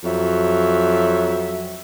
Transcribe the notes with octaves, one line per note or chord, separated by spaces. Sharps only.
F2 F#3 E5